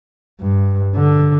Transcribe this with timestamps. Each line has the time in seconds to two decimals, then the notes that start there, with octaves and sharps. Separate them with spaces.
0.41 G2
0.96 D3